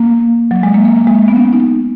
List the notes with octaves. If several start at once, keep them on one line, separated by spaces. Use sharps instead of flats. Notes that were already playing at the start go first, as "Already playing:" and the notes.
Already playing: A#3
F#3
G#3
A#3
A#3
A#3
G#3
B3
C#4
D#4